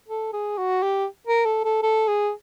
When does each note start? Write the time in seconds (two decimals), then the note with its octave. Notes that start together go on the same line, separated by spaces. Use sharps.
0.08 A4
0.33 G#4
0.58 F#4
0.83 G4
1.27 A#4
1.45 A4
1.64 A4
1.83 A4
2.08 G#4